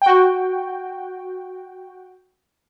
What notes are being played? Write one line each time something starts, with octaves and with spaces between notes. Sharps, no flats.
F#4 G5